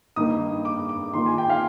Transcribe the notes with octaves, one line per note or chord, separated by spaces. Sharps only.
G2 D#3 A#3 D#4 D#6
D6
D6
D#3 A#3 F4 C6
G#5
G5
F5